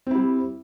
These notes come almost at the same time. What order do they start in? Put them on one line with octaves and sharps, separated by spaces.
C4 E4 G3